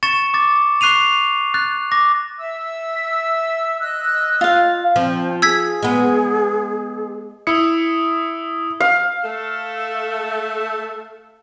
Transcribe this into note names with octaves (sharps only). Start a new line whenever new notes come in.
C#6 A6 C#7 E7
D6 A6
C#6 F#6 C7 D#7 F7
F#6 A6
D6 A#6
E5 E6
D#5 E6 F#6
F4 F5
F3 C4
G#4 E6 G#6 B6
G#3 B3
E4 D#6 E6 C#7
F5
A3 A4